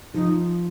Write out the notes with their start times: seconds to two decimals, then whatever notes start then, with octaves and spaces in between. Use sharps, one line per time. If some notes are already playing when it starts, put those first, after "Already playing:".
0.14 F3 D#4